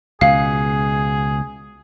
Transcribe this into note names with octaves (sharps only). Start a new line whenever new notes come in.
C#2 B2 G#4 F5